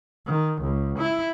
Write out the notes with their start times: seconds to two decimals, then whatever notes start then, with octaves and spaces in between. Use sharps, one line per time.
0.26 D#3
0.61 C#2
0.98 E4